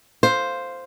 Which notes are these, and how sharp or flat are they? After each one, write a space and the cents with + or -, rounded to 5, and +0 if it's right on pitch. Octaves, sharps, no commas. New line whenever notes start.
C5 +0 F5 +0